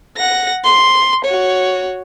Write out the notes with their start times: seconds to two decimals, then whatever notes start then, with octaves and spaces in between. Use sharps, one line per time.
0.17 F#5 A#6
0.64 C6
1.25 F#4 C#5